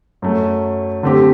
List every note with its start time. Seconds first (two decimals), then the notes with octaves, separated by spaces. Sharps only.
0.22 F#2 F#3 A3
1.03 D3 A3 C4 G4